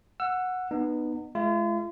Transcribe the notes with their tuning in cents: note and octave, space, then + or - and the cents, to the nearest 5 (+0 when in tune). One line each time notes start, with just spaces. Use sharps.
F#5 -10 E6 +25
B3 -5 D#4 -35
G#3 +40 F4 -40